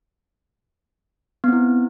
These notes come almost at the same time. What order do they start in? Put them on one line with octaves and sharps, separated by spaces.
B3 C4 E4